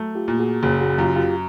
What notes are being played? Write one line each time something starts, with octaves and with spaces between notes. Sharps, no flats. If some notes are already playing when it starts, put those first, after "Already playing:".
Already playing: F#3 A3
F4 G4
A#2
F#4 G#4
F#1 F#4 G#4
F#4 G#4
F#2 F4 G4
F4 G4